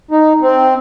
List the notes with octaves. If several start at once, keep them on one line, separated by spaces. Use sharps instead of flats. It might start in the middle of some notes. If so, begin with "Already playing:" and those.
D#4
C4